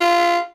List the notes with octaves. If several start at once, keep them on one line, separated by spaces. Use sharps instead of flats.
F4